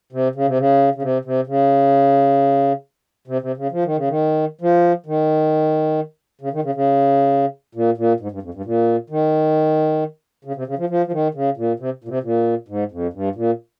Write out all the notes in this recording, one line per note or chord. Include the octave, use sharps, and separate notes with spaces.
C3
C#3
C3
C#3
C#3
C3
C3
C#3
C3
C3
C#3
F3
D#3
C#3
D#3
F3
D#3
C#3
D#3
C#3
C#3
A#2
A#2
G#2
G2
F2
G2
A#2
D#3
C#3
C3
C#3
F3
F3
F3
D#3
C#3
A#2
C3
A#2
C3
A#2
G#2
F2
G2
A#2